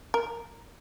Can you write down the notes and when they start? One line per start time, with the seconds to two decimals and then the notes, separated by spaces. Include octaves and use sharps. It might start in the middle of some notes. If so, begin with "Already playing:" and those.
0.14 A#4